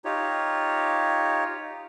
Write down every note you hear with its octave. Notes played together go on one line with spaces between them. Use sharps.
D#4 F4 G4 C#5